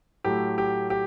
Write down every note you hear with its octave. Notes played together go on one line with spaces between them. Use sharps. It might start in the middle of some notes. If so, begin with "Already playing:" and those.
A2 F#3 A3 G4
G4
G4